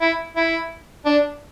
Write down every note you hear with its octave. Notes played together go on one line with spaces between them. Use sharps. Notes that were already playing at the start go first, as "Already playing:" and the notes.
E4
E4
D4